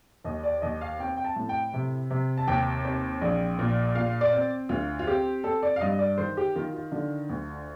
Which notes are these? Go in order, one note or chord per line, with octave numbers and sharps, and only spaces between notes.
D#2 D#5
D5
D#2 D#5
F5
C4 G5
G5
A5
A2
G5
C3
C3
A5
D#2 G5
C4
A#1
A#2
A#2 F5
D5
C4
D2 F4
F4
C4 G4
C4 A4
D5
F5
G2 D#5
D5
D#3 C5
G4
D#3 F4
F4
D3 F4
D2